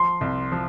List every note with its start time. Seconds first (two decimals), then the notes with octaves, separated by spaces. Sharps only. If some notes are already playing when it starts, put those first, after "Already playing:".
Already playing: F3 C6
0.21 C2
0.52 F3